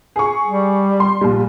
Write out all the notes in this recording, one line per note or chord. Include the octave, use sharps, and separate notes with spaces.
G#4 C#6
G3
C6
A#1 G3